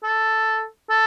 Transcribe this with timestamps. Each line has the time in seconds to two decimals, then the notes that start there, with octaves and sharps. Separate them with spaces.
0.04 A4
0.90 A4